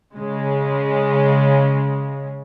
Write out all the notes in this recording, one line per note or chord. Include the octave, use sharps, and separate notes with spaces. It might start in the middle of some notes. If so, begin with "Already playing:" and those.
C#3 G#3